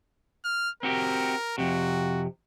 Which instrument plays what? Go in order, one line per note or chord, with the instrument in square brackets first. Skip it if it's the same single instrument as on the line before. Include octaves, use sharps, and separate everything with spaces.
[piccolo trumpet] F6
[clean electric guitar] C4 F#4 G4 [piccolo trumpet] A#4
[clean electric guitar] F2 C3 [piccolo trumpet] F#4